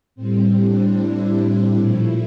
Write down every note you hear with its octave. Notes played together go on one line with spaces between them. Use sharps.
A2 G3 C4
D4
E4
A#2 F3 A3